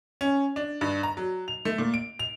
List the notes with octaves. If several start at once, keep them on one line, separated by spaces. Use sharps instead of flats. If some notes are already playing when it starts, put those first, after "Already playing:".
C#4
D4
G2
A#5
F#3
F7
A3
A#2
D7
F7